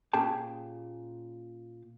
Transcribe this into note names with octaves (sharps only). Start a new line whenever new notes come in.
A#2 C#4 G4 G#4 G5 A5